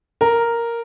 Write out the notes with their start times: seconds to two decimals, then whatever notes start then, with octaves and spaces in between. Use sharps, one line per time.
0.21 A#4